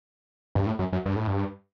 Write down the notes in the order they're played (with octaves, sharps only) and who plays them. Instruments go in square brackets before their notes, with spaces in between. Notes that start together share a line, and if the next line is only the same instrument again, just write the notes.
[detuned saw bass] G2
A2
F#2
F#2
G2
A2
G2